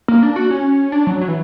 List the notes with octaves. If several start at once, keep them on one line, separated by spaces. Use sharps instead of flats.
A#3
D4
F#4
C#4
D4
F#3
F#3
E3